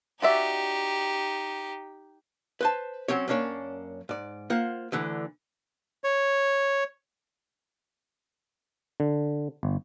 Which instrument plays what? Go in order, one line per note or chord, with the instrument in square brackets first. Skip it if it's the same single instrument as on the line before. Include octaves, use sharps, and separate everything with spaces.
[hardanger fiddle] D#4 G4 [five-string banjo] F#4 D5 E5
[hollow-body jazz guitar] B4 C5 A5
F#3 C4 C#4 C#5
F#2 A#3 C#4 D4 C#5
G#2 D5
A#3 F4 C5 F#5
D2 D3 E3
[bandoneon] C#5
[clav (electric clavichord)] D3
G1